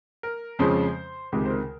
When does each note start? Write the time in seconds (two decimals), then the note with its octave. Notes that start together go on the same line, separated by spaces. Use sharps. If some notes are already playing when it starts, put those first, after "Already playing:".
0.23 A#4
0.59 F2 C#3 F3 G#3 C#4 C5
1.32 C#2 C3 D#3 G#3 G4
1.46 C5
1.50 A#4